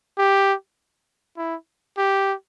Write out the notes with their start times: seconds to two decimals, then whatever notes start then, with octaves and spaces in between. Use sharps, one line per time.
0.18 G4
1.38 E4
1.98 G4